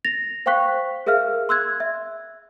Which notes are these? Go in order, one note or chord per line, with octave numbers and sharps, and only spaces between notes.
A6 A#6 F7
C5 F5 G5 C#6 F#6 B6
G#4 A#4 E5 F5 F6
C6 E6 F#6 G#6
E5